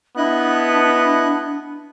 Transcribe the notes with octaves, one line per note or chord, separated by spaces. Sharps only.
B3 D4 E4 D#5 F#6